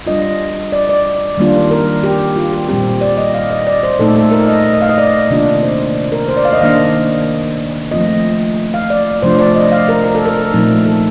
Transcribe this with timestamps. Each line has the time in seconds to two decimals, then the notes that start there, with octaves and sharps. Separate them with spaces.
0.06 G3 D4 F4 D#5
0.72 D5
0.89 D5
1.37 D#3 G3 A#3 D4 F4
1.71 A#4
2.03 G4
2.36 F4
2.53 G4
2.68 A#2 G3 C4 G4
3.01 D5
3.18 D#5
3.34 F5
3.51 D#5
3.67 D5
3.83 C5
3.99 A#2 A3 D#4 A4
4.16 A4
4.32 A#4
4.48 D#5
4.73 D#5
4.82 F5
4.89 D#5
4.98 D5
5.30 C3 D#3 A#3 D4 F4
5.63 C5
6.12 A#4
6.28 C5
6.37 D5
6.45 F5
6.53 D#5
6.61 D#3 A#3 D4 F5
7.91 F3 A3 C4 F4 D#5
8.74 F5
8.90 D5
9.22 C3 F3 A3 D4 F4 C5
9.39 D5
9.55 D#5
9.72 F5
9.89 A#4
10.04 A#4
10.15 A4
10.26 A#4
10.53 A#2 F3 A3 C4 D#4
10.86 A4